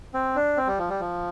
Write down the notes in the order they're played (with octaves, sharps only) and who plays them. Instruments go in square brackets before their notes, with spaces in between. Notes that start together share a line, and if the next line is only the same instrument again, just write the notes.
[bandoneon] C4
D4
C4
G3
F3
G3
F3